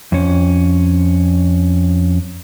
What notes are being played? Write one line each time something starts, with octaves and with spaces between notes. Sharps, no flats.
F2 C#4